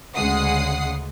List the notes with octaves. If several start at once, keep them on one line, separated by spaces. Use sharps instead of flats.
D2 C#3 G#3 F#5 D#6 C7